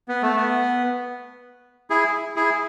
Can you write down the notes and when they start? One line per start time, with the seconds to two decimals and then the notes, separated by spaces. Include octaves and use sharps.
0.08 B3
0.22 A3
0.36 B3
1.90 E4 G#4
2.36 E4 G#4